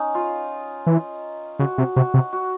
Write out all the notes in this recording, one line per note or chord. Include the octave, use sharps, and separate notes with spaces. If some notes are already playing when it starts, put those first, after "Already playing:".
Already playing: C#4 D#4
F4
E3
C#3 F#4
C3
C3 F#4
C3
F#4